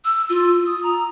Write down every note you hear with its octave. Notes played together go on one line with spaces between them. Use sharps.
E6
F4
D#6
A#5